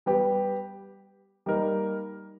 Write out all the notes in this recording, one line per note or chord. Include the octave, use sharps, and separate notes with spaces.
G3 B3 G4 B4
G3 A#3 D#4 A#4